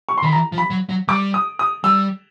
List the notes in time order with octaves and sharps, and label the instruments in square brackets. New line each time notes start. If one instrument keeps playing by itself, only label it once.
[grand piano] C#6
C6
[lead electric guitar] D#3 [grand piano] B5
[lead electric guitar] E3 [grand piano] A#5
[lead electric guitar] F3
[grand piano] B5
[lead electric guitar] F#3
F#3
[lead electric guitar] G3 [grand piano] D6
[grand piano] D#6
D#6
[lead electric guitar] G3 [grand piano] E6